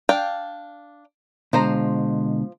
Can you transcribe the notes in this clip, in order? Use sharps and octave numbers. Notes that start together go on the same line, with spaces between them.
D4 F5 G5
B2 D3 F3 G#3 C5 A#5